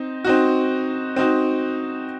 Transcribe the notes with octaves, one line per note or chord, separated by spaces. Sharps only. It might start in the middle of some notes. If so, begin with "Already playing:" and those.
Already playing: C4 D#4
C4 D#4 F#4
C4 D#4 F#4